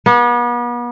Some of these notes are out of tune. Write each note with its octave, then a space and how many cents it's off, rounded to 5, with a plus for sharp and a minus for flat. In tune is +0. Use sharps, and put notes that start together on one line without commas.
B3 -40